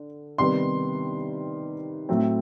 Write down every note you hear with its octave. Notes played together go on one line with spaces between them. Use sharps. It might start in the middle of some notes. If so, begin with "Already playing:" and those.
Already playing: D3
C3 D#3 G3 B3 C6
A2 F#3 A3 C4